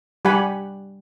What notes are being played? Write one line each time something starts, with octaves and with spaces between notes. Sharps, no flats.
G3 G4 F#5 G#5 B5